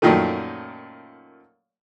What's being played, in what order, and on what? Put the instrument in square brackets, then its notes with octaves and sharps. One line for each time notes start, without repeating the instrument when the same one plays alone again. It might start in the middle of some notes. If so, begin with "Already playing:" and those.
[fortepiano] F#2 A#2 D#3 F3 A3